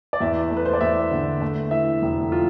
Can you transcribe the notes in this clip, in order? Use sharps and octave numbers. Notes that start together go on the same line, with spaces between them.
D5
E2 E5
A3
B4
C5
D5
E2 E5
D3
A3
E3 E5
F1
F4